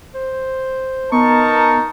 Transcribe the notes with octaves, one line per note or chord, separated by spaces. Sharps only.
C5
B3 D#4 A#4 A5 C#6